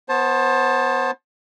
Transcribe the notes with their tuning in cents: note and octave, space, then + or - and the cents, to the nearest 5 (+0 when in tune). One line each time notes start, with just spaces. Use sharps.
B3 +0 C5 +30 A5 -5